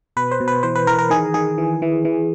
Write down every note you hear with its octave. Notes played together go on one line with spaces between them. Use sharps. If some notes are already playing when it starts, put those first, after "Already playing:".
B2 B4
C5
B2
B4
E3 C5
B4
E3 A#4
A#4
D#3 G#4
D#3 G#4
E3
E3
E3